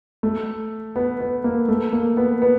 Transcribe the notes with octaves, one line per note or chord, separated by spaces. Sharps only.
A3
B3
B3
A#3
A3
A#3
B3
B3